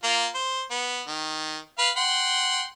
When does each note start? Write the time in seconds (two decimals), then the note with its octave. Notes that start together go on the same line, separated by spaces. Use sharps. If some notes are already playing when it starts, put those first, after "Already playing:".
0.04 A#3 F4
0.35 C5
0.71 B3
1.08 D#3
1.79 B4 F5
1.97 F#5 G5 C6